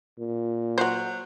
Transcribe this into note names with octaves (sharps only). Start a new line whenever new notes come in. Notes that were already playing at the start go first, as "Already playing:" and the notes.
A#2
F#3 F#4 C5